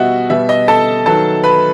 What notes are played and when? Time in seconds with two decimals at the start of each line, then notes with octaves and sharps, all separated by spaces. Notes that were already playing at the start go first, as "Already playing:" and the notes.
Already playing: B2 G3 B3 F#4 D#5 E5 F#5
0.30 B2 G3 B3 E5
0.49 D#5
0.68 A4 A5
1.06 D#3 F#3 B3 A4 A5
1.44 B4 B5